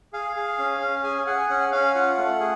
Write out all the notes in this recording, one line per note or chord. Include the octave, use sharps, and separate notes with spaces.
G#4 F5
G#4
C#4
C#4
G#4 G#5
G#4 F#5
C#4 F#5
C#4 F5
F4 F#5
A3
G#4